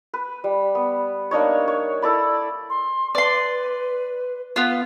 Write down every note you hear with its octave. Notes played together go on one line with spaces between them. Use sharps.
B4
G3
B3
A#3 D4 D#4 C#5
C#5
E4 A4 D5 B5
C6
B4 D5 C6
B3 F4